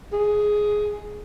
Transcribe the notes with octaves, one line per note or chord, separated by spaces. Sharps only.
G#4